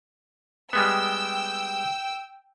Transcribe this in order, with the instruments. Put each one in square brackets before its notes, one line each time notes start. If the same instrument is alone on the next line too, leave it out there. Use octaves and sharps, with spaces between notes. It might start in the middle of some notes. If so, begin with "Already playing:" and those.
[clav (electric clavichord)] G3 G#3 B3 [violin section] G5 E6